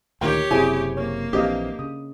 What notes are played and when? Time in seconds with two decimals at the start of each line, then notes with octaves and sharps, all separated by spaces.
0.21 D2 A#2 D#3 G4 A#4 C#5 G5
0.51 F#1 C3 C4 E4 G#4 D5 G#5
0.97 A#3 C#5
1.33 A#1 E3 C4 D4 G4 D#5 F5
1.79 C#3 D#6